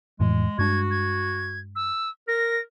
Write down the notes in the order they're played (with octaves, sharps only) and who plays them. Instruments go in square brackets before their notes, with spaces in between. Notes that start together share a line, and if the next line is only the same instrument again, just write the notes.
[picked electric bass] F2 A2 E3 [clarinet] G#3
[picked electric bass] G2 G#3 D4 [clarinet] F#4 [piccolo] G#6
[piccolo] G#6
E6
[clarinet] A#4 [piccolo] A#6